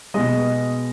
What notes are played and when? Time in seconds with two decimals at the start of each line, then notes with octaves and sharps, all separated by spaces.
0.14 B2 G#3 D#5